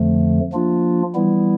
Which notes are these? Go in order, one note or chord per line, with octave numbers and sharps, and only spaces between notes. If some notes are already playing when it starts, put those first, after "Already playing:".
Already playing: F2 D3 F3 A3
F3 A#3 D4 F4
E3 G3 B3 E4